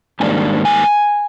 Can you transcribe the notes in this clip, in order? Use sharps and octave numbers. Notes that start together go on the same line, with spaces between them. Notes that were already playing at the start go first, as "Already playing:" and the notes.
G#2 D#3 G3 A#3 D4 G#5
G#5